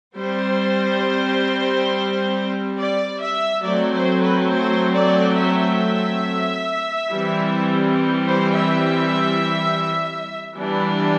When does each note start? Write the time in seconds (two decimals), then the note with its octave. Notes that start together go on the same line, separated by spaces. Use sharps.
0.16 G3 C4 C5
2.77 D5
3.20 E5
3.63 F#3 A3 C4 D5
3.92 C5
4.21 B4
4.50 C5
4.92 D5
5.36 E5
7.10 E3 G3 C4
8.26 C5
8.55 E5
10.56 E3 G3 B3 D4